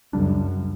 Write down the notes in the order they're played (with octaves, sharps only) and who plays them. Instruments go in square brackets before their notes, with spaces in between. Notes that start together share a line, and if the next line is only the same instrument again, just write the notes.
[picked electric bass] C#2 C#3 G3 D4 [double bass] F#2